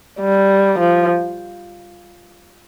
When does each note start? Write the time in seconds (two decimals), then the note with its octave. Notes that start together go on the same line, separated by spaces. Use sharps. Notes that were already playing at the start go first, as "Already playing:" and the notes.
0.21 G3
0.80 F3